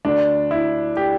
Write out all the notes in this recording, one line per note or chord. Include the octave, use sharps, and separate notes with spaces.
D2 D3 D4
E4
G4